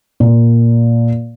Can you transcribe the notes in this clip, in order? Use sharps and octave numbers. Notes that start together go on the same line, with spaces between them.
A#2